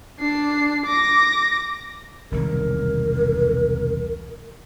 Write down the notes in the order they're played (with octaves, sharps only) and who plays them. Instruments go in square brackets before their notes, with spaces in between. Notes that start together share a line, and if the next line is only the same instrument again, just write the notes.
[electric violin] D4 C7
D6 A#6
[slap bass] E1 C2 D#3 [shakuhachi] A#4